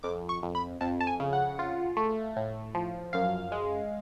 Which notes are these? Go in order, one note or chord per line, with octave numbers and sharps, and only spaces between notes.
F2 D6
C#6
F2
B5
F2 A5
A5
G#5
C#3
F#5
F4
A3
A2
F3
F#2 F5
G#3